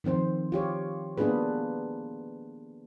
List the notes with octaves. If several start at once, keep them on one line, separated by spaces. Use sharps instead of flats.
D#3 F3 C4 C5
F4 G4 C#5
A#3 B3 D4 F4 G#4 B4